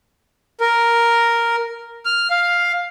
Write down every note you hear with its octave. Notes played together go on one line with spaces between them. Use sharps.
A#4
F6
F5